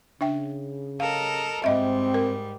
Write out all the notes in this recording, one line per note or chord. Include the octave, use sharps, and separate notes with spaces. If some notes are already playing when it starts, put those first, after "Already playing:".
C#3 D4 E5 G5
A4 A#4 D#5 F5
G#2 G3 C4 D#5 E5
A#4